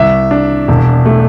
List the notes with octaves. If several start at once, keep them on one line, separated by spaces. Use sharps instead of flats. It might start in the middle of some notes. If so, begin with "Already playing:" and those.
Already playing: C2 E5
D4
E1
A3